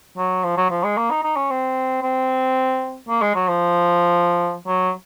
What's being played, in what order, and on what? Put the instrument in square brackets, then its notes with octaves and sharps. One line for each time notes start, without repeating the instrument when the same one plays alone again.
[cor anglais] F#3
F3
F#3
F3
G#3
A#3
D#4
D#4
C#4
C4
C4
A#3
G#3
F#3
F3
F#3